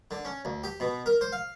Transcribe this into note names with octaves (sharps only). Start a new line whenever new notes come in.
D3
C#4
D2
G4
B2
A#4
C5
F5